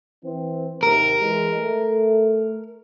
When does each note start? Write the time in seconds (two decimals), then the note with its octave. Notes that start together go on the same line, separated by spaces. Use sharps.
0.24 E3 C4
0.83 D#2 C3 A#4
1.19 E3 G#3
1.56 A3